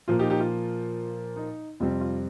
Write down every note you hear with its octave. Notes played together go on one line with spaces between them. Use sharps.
A#2 F3 A#3 F4
D#4 G4
D#4 G4
F4
D#4
F2 C3 G3 C4 F4
F4